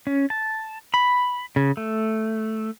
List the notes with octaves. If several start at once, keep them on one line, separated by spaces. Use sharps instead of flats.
C#4
A5
B5
C#3
A3